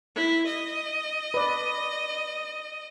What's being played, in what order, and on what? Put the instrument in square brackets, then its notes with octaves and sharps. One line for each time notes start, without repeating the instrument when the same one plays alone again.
[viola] E4
D#5
[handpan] B4 D5